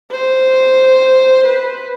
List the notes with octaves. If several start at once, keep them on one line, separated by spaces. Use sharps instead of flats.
C5
B4